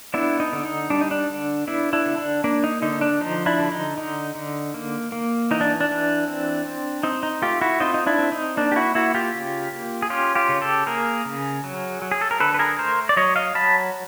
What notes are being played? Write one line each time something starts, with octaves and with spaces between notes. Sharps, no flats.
B3 D4 E4
D#4
D3
D#4
G3 D4
D#4
D4
D3
B3 D4 E4
D4 E4
D3
D4
A#3 D4
D#4
D3 D#4
D4
F3 D#4
D4 E4
D3
D#4
D3 D#4
D3
A#3
A#3
E3 D#4
D4
D4
E3
C4
C4
C4 D#4
D#4
A3 F4 G4
E4 F#4
C4 D#4 F4
D#4
D4 E4
C4
D#4
A#3 D4
G4
E4 F#4
A#3 E4 F#4
F4 G4
C#3
A#3
G#4
C#4 F4 G4
F4 G4
C#3
G4 A4
A#3 G#4 A#4
C#3
F#3
F#3
G#4
A4
A#4
D3 A4 B4
B4
G#4 A#4
A3 A#4 C5
D5
F#3 C#5 D#5
D#5 F5
F#3 A5 B5